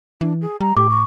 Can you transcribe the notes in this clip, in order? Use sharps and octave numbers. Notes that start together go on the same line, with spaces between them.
E3 D4
G#4
G3 A#5
A2 G4 D6
C#6